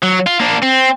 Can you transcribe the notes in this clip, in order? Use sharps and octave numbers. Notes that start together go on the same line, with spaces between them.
F#3
F4
A#3 D4
C4